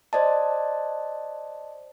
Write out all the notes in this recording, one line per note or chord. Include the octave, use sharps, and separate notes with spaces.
C5 D5 D#5 A5